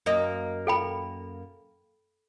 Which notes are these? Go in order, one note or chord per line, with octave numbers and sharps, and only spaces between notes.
F#2 A#3 D#5
A4 G5 B5